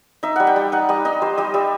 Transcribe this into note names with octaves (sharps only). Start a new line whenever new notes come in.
D#4 E5
G3 F#5
G5
G3
D#4 F#5
G3 D#5
D#4 D#5
G3 C5
G3 D#5
G3 E5